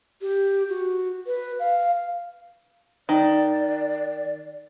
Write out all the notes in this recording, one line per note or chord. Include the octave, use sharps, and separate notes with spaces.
G4
F#4
B4
F5
D#3 D5